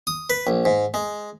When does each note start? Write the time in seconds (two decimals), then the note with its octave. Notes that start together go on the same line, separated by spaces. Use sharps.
0.07 D#6
0.30 B4
0.47 A#1
0.65 G#2
0.94 G#3